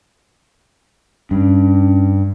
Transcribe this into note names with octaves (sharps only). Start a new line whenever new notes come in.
G2 C#4